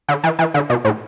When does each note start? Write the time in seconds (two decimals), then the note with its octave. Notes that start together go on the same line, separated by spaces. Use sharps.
0.08 D3
0.23 E3
0.39 E3
0.54 D3
0.70 B2
0.85 A2